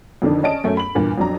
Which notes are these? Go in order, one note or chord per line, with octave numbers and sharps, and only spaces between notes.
F2 D3 D#3 D4
C#4 D5 D#5 A5 D7
F#2 A3 C#4
B5 F#7
E2 G2 A#2
F2 F#3 D4 A#5